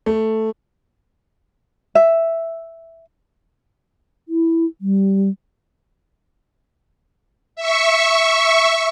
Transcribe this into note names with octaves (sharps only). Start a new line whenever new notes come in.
A3
E5
E4
G3
E5 C#6